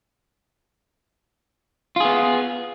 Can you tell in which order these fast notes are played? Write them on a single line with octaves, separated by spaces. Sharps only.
F4 G#4 B3